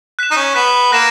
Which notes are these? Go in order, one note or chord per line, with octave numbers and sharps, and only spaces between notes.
F#6 B6 E7
D#4
C#4
B3 F#6 B6 E7
A#3 F#6 A#6 E7